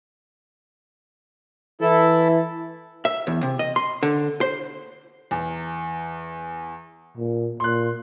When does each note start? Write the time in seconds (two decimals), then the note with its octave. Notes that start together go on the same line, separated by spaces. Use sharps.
1.81 E3 E4 A4
3.05 E5
3.27 E2
3.43 C3
3.59 D#5
3.76 C6
4.03 D3
4.41 C5
5.31 E2
7.17 A#2
7.60 A#2 C6 F#6